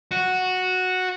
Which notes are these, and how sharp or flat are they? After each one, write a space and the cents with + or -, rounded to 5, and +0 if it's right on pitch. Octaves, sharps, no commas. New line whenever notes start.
F#4 -5